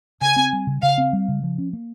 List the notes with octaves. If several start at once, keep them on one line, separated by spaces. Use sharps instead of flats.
C#3 G#5
C4
G3
C#3
C#3 F5
C4
G3
C#3
F3
C#4
A#3